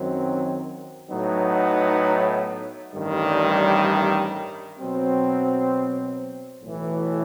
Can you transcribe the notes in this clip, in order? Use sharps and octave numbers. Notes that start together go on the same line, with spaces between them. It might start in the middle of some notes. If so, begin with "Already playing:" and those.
Already playing: F#2 D#3 F#3 C4
A2 F#3 B3 D#4
A1 G2 D#3 G3
B2 F#3 C4
B1 A2 E3